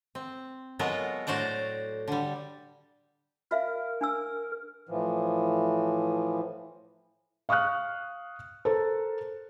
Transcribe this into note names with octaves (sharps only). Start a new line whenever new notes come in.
C4
F#3 G#3 B3 F4 A4 A#4
A2 F#4 C5 D5 A#5
D3 G3
F#4 A#4 E5 F5
D4 G#5 E6
A2 E3 F3
F5 C#6 D#6 F6 F#6
A4 A#4 C5